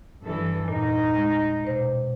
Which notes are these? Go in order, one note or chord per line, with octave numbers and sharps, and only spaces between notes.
G2 E3 A4
E2 A#2 D#4
G#3
B2 C5